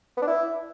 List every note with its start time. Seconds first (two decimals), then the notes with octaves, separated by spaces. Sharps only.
0.17 B3
0.22 D4
0.27 E4